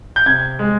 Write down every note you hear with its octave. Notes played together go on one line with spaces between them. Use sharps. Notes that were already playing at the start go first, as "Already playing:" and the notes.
G6
C3 G#6
G#3